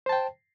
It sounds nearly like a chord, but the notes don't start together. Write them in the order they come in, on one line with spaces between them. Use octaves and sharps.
C5 A5 G5